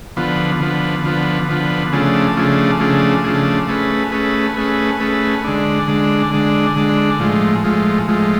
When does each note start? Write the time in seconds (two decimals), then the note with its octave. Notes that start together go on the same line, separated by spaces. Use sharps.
0.16 D3 F3 B3
0.60 D3 F3 B3
1.04 D3 F3 B3
1.49 D3 F3 B3
1.92 C#3 F3 A3 D4 G#4
2.36 C#3 F3 A3 D4 G#4
2.80 C#3 F3 A3 D4 G#4
3.24 C#3 F3 A3 D4 G#4
3.68 A3 C#4 G#4 B4
4.12 A3 C#4 G#4 B4
4.56 A3 C#4 G#4 B4
5.00 A3 C#4 G#4 B4
5.44 D3 G#3 D4
5.88 D3 G#3 D4
6.31 D3 G#3 D4
6.76 D3 G#3 D4
7.20 A2 F3 G#3
7.64 A2 F3 G#3
8.08 A2 F3 G#3